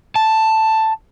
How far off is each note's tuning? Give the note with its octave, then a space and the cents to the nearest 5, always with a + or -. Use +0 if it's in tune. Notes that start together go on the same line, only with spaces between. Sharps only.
A5 +5